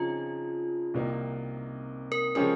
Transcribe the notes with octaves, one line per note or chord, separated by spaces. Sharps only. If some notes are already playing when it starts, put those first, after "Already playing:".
Already playing: C#3 F3 C4 D#4 F4 G#4
C2 C3 D#3 A#3 D#4
A#4
C#3 F3 G#3 C#4 G4 A#4